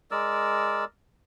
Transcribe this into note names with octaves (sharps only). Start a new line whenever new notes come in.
G#3 A#4 D5 E6